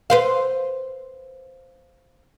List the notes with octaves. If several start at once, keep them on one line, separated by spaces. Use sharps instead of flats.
B4 C5 F5